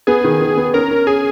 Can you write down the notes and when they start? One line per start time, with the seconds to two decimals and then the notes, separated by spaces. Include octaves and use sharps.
0.07 B3 G#4
0.24 D#3
0.41 D#3
0.57 B3
0.74 C#4 A#4
0.91 C#4
1.07 C#4 G#4